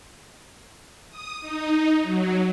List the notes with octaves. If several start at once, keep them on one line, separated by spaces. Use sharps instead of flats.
D#6
D#4
F#3